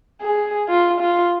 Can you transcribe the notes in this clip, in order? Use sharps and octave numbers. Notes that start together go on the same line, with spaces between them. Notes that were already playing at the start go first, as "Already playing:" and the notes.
G#4
F4
F4